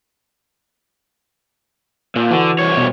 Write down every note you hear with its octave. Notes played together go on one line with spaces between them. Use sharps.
A#2
D3 E3 F#4
C2 C#5
B2